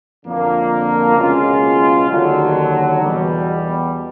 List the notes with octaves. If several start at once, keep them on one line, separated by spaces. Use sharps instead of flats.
F2 D3 F3 A#3
C#2 B2 G#3 C#4 F4
D#2 D3 F#3
E2 B2 G3